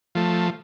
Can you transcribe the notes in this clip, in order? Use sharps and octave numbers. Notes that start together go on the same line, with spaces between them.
F3 A3